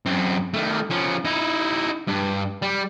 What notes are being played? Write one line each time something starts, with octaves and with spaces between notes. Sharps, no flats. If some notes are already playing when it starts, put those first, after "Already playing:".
F#2 C4
D#3 A3
F3 C#4
D#4 E4
G2
G3